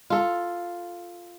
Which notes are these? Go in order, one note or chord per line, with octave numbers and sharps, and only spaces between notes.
F4 A4